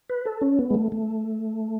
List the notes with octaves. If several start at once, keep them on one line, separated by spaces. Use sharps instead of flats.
B4
A4
C#4
B3
G#3
A3
A3